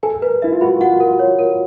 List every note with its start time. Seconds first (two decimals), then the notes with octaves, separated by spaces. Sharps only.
0.03 A4 G#5
0.22 A#4 B4
0.42 E4 E5
0.52 F4
0.61 F#4 B5
0.81 F4 F#5
1.00 A#4
1.19 C#5
1.39 A#4